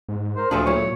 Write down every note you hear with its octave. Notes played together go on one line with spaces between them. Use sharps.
G#2
A#4 C5
D2 A#2 F3 D4 G#4 A4
F#3 A3 E4 C#5